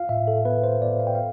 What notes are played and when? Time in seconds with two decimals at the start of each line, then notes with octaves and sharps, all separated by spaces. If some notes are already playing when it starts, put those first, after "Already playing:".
Already playing: F4 F5
0.09 A2 E5
0.28 A4
0.45 B3 B4
0.64 C5
0.82 B3 D5
1.00 F5
1.07 G5
1.15 F5